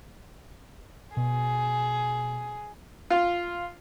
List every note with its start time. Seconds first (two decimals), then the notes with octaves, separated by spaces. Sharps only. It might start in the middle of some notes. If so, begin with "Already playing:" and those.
1.17 B2 G#4
3.10 F4